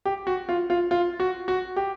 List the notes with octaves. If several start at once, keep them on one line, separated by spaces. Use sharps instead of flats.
G4
F#4
F4
F4
F4
F#4
F#4
G4